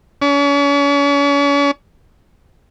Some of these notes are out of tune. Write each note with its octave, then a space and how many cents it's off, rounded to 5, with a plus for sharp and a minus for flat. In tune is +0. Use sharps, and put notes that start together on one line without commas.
C#4 +40